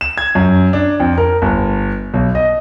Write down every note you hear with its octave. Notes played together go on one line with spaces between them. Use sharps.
E7
G#6
F#2
D4
F2
A#4
G1
B1
D#5